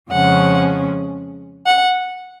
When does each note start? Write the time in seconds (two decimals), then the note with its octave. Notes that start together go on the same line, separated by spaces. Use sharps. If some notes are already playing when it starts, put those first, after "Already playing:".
0.11 F2 C#3 F3 G#3 C#4 F#5
1.66 F#5